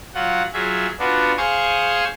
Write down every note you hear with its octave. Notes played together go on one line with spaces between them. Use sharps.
F#3 F4 F#5
F#3 F4 G#4 E5
B3 D4 F4 F#4
G#4 C5 F5 G#5 C#6 D#6